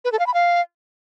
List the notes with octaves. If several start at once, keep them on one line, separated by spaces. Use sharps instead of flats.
B4
A4
F5
B5
F5